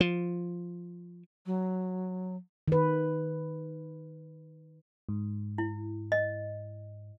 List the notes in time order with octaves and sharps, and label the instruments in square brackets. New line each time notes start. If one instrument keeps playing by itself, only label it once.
[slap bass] F3
[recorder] F#3
[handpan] D#3 B4
[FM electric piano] G#2
[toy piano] E4
D#5